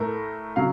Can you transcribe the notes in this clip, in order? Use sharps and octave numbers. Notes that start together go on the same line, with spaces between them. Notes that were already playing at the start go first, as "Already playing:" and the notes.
Already playing: A2 A3 A#4
C#3 F#3 F5